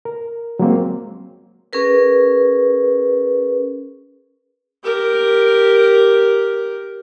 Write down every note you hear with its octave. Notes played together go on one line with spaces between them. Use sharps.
A#4
F#3 G#3 A#3 C4
C#4 G#4 A#4 B4
G4 A#4